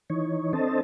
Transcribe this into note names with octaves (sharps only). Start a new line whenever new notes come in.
E3 D#4 C#5
C4 D4 A4 C5 D#5 A5